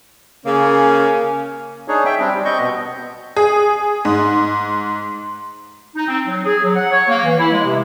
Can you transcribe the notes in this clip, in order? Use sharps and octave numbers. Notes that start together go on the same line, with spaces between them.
C#3 A#3 C#4
D4 D#4 G#4 C#5
E5 G5
G3 C4 D4
G3
C4 D#5 C#6 G6
B2 B3
G#4
G#2
D#4
C4
F#3
G#4
F#3
F#5
C#5
A#3
E3
E4
G#3
C3